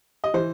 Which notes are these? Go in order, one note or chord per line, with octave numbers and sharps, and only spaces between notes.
D#5
E3 C5